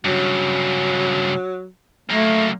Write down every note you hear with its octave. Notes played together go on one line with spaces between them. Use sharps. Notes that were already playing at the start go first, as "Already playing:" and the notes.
G2 C#3 F#3
F#2 A3 A#3